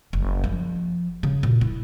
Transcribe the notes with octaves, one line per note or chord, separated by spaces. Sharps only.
F#1
F3
C#3
A#2
E4